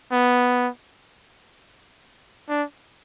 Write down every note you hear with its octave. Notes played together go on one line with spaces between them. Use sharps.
B3
D4